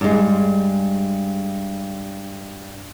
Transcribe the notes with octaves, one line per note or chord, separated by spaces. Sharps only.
G2 G#3